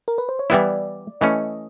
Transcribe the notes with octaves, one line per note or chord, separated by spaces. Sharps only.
A#4
B4
C5
C#5
E3 G3 B3 E4 D5
E3 A3 C#4 D#5